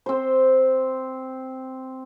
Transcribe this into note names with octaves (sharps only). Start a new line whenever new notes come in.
C4 C5